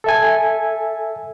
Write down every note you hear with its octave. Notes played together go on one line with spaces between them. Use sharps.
A4 E5 G#5